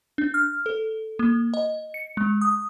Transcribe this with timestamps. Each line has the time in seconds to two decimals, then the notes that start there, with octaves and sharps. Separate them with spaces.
0.18 D4
0.34 F6
0.66 A4
1.19 A#3
1.54 D#5
1.94 C#7
2.17 G#3
2.41 D#6